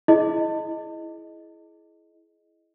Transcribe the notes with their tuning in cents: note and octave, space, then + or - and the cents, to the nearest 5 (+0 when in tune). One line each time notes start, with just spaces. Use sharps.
E4 +5 G#4 +30 D#5 +0